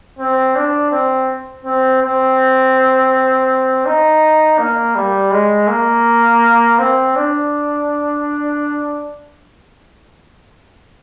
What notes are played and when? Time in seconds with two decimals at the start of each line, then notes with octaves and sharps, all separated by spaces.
0.19 C4
0.56 D4
0.91 C4
1.65 C4
2.02 C4
3.86 D#4
4.59 A#3
4.96 G3
5.31 G#3
5.68 A#3
6.79 C4
7.16 D4